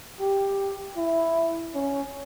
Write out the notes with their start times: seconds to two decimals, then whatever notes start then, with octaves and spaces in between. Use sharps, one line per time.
0.20 G4
0.97 E4
1.75 C#4